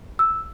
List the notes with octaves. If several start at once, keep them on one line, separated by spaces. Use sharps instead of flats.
E6